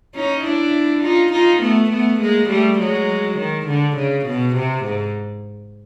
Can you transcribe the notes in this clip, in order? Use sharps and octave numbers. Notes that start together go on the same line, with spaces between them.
C#4 D#4
D4 E4
D#4 F4
D#4 F4
A3 B3
A3 B3
G#3 A#3
G3 A3
F#3 G#3
D#3
D3
C#3
B2
C3
G#2